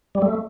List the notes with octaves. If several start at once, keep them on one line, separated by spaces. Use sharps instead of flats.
G3
A3